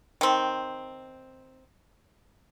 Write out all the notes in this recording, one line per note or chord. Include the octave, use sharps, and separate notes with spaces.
D#3 C4